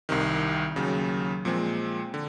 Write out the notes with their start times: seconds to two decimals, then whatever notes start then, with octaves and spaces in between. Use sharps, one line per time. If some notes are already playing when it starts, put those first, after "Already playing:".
0.09 C2 C3 D#3
0.76 D#2 C#3 F#3
1.45 A#2 F3 G#3 C4
2.14 D3